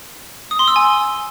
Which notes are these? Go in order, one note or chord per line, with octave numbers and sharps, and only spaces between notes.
D#6
C6
E6
G#5